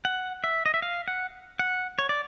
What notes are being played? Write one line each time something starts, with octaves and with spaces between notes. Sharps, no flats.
F#5
E5
D#5
E5
F5
F#5
F#5
C#5
D5